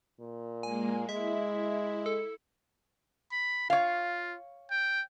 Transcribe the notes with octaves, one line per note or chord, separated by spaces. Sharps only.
A#2
G#3 A#3 G#5
G#3 E4 E5
A4
B5
F4 C#5 F5
G5